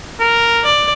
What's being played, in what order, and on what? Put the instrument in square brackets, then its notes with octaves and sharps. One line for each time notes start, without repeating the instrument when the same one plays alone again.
[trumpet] A#4
[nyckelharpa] D5